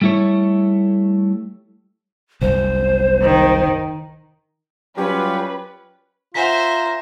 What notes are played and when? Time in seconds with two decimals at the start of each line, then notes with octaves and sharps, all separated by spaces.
0.02 G3 A3 E4 A4 C#5
2.41 F#1 C2 C5
3.22 D#3
4.97 F#3 G3 C#4 F4 G4 B4
6.34 F4 C5 E5 F#5 G#5 A#5 B6